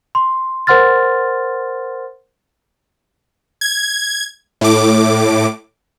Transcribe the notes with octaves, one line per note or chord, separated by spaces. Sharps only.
C6
A#4 C5 F#5 C6 F6 A6
G#6
A2 D6